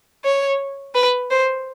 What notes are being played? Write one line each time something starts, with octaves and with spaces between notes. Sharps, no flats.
C#5
B4
C5